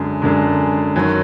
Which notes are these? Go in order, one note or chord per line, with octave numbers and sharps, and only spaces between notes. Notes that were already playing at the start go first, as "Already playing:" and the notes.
Already playing: F#2 D3 G#3
F#2 D3 G#3
F#2 D#3 F#3